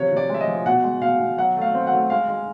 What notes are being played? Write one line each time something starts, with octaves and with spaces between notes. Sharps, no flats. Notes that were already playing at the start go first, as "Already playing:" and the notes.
Already playing: C3 F3 C#5
C3
D5
G#3
E5
D#5
F3
B2 F#5
G#3
B2 F5
B2
F#3 F#5
A3 F5
C4
F#5
A3
G#3 F5
G#3